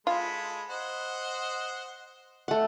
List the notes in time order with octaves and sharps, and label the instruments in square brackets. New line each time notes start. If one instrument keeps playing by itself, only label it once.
[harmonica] G#3 A4 B5 [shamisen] F4
[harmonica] C5 D#5 F#5
[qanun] A3 F#5